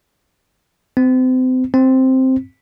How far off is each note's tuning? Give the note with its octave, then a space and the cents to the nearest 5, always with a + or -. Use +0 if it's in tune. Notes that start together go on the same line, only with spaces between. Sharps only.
C4 -35
C4 +0